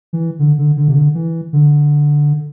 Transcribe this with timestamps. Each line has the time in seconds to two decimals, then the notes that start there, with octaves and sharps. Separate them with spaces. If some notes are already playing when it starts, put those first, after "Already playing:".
0.13 E3
0.39 D3
0.58 D3
0.77 D3
0.88 C3
0.95 D3
1.15 E3
1.53 D3